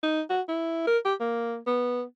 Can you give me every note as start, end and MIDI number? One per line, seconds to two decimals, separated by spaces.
0.03 0.21 63
0.30 0.41 66
0.48 0.86 64
0.87 0.98 70
1.05 1.14 67
1.20 1.57 58
1.67 2.03 59